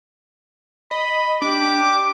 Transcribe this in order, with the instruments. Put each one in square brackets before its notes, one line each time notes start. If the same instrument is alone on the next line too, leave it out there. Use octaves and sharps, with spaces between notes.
[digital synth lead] D#5 [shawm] B5
[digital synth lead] D4 [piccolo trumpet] G4 [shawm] D6